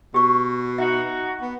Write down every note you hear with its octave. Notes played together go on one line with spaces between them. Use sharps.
B2 G4 C#6
D#4 F#4 E5
B3